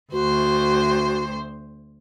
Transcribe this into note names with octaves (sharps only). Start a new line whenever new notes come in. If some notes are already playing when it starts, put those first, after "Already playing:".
D2 F#4 C5